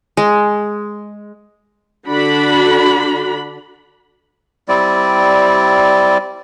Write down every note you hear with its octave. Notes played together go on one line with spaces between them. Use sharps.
G#3
D3 D4 F#4 B5
G3 C4 E4 D5